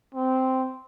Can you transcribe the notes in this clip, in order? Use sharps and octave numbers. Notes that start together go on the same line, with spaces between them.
C4